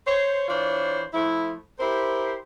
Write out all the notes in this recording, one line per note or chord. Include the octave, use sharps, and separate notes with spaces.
C5 C#5
E3 D4 F4 C5 C#5
F3 A3 E4
E4 G4 A#4 C5